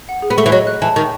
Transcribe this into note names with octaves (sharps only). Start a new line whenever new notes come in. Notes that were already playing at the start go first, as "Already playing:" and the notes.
F#5
G#4
B3
A3 C#6
E3
F#3 D#5
F#6
E3 A5
D#3 C#6